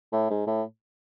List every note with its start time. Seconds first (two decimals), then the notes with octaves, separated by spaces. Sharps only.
0.13 A2
0.30 G#2
0.47 A2